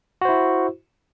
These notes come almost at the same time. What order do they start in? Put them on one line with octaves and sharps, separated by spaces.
F#4 C5 E4